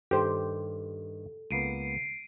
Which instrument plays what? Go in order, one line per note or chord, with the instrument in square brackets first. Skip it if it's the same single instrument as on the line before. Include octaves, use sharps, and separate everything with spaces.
[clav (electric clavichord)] G2 D#3 [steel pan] G4 C5 [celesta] A4
[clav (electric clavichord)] C#2 A#3 B3 [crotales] C7 D7 D#7